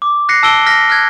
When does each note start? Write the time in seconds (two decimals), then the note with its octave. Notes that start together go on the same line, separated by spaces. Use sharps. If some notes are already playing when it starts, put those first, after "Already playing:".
0.02 D6
0.29 F#6 A#6 C7 C#7
0.43 A5 E6 D7 G7
0.66 F6 A#6 B6
0.89 F6 F#6 G#6